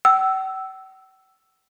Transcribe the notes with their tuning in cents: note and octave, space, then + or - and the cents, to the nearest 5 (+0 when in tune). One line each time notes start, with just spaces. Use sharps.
G5 -45 E6 +0